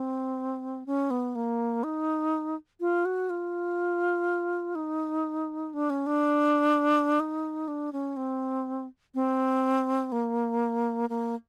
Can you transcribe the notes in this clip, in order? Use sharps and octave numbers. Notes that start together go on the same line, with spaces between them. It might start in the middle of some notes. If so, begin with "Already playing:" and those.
Already playing: C4
C#4
B3
A#3
D#4
F4
F#4
F4
D#4
D4
C#4
D4
D#4
D4
C#4
C4
C4
A#3
A#3